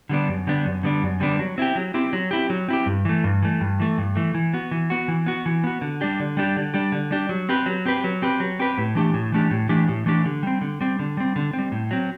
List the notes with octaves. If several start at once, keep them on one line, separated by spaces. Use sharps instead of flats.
D3 G3 B3 D4
F#2
D3 G3 B3 D4
F#2
D3 G3 B3 D4
F#2
D3 G3 B3 D4
F#3
C4 E4 G4
F#3
C4 E4 G4
F#3
C4 E4 G4
F#3
C4 E4 G4
G2
E3 A3
G2
E3 A3
G2
E3 A3
G2
E3 A3
E3
B3 F#4
E3
B3 F#4
E3
B3 F#4
E3
B3 F#4
D3
G3 D4 G4
D3
G3 D4 G4
D3
G3 D4 G4
D3
G3 D4 G4
F#3
C4 G4 B4
F#3
C4 G4 B4
F#3
C4 G4 B4
F#3
C4 G4 B4
A2
E3 A3 D4 G4
A2
E3 A3 D4 G4
A2
E3 A3 D4 G4
A2
E3 A3 D4 G4
D3
G3 C4
D3
G3 C4
D3
G3 C4
D3
C4
G3
A2
F#3 C4